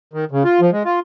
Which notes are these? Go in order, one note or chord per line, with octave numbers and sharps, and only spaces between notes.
D#3
C#3
F4
F3
G#3
F4